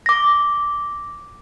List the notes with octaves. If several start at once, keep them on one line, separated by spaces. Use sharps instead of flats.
D6 A#6